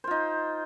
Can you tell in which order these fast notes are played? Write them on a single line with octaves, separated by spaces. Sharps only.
C5 F4 D#4